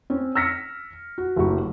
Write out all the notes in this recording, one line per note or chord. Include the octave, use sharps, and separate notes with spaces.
C4 C#4
E6 F6 A#6 B6 C#7
F#4
F#1 D2 G4 C#6